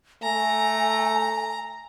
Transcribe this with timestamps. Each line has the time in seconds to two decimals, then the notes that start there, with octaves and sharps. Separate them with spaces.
0.23 A3 G#5 A#5